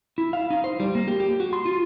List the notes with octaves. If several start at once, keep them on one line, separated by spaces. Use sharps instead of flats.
E4
F5
D#4
C5
G3
A#3
G4
G4
F#4
C6
F4